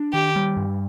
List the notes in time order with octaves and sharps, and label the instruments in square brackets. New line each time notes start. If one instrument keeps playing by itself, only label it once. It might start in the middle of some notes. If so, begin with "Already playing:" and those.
Already playing: [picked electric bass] D4
[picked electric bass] D#3 [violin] G4
[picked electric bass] G3
G2